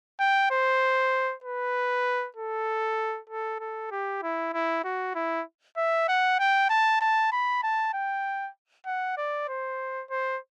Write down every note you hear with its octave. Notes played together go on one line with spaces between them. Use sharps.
G5
C5
B4
A4
A4
A4
G4
E4
E4
F#4
E4
E5
F#5
G5
A5
A5
B5
A5
G5
F#5
D5
C5
C5